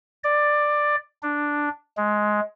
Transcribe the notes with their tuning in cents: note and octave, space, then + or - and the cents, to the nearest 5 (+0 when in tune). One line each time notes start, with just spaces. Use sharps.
D5 +10
D4 +0
G#3 +15